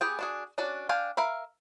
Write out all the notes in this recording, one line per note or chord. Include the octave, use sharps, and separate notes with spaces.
B3 G4 G#4 G5
D4 F#4 G#4
C#4 D4 F#4 D5
D4 F5 G5 G#5
A#4 E5 F5 B5